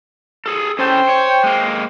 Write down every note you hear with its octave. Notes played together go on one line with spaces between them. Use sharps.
G#4 A4
C#4 A4 C5 G5
C#5
G#3 A#3